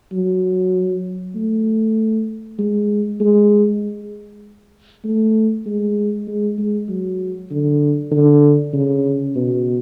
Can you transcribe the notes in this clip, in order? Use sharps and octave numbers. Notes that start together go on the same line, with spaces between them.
F#3
A3
G#3
G#3
A3
G#3
G#3
G#3
F#3
D3
D3
C#3
B2